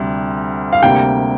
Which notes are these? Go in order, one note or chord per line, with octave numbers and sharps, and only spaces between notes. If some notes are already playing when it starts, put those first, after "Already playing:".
Already playing: D2 C3 G3
F5
D2 C3 G3 A#3 G5